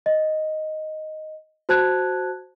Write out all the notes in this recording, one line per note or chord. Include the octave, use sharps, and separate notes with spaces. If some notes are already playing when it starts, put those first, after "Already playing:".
D#5
F#4 C5 A5 F#6 G#6